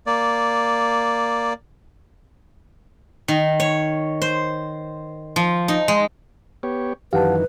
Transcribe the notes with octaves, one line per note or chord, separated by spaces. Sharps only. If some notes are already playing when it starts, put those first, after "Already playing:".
A#3 D5
D#3
C#5
C5
F3
D#4
G#3
B3 G4 C#5
F#2 D#3 E3 G4 B4 F5 F#5 A5